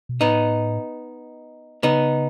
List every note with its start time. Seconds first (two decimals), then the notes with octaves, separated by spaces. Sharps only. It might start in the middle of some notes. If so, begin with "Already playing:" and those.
0.09 B2
0.21 A2 B3 D#4
1.83 C#3 B3 D#4